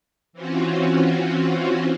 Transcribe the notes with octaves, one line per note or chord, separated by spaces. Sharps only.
E3 C4 C#4 F4 F#4